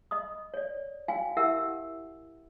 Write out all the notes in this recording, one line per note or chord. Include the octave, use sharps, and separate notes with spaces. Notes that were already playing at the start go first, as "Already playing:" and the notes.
D#5 B5 D#6
C#5 D5
F#4 F5 G5 G#5
E4 G4 A#4 E5 F#5 E6